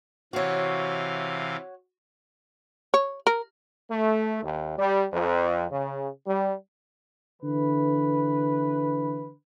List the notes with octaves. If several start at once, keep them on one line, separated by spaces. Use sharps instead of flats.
C3 E3 F#4 C#5 F5
C#5
A#4
A3
D#2
G3
F2
C#3
G3
D3 E3 B4